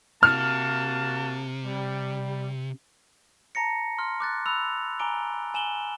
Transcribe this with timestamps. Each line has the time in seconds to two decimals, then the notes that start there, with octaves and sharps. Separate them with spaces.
0.23 C3 A#3 F#4 A5 F6
1.66 G3
3.55 A5 A#5 A#6 C#7
3.98 C6 F6
4.20 D6 F#6 A6
4.46 B5 E6 F#6 F7
4.99 G#5 A#5 D6 D7 G7
5.54 G#5 E7 F#7 G7